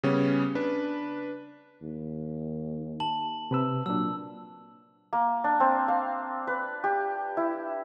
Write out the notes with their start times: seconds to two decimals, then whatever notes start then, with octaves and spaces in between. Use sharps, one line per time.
0.03 C#3 G3 B3 C#4
0.55 D4 B4
1.82 D#2
3.00 A5 F#7
3.51 C3 B4 E6
3.86 A#2 F#3 D4 E6
5.13 A#3
5.44 D4
5.60 C4
5.88 F5
6.47 B4
6.84 G4
7.37 E4